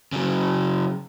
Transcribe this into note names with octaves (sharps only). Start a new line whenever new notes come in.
C#3 F#3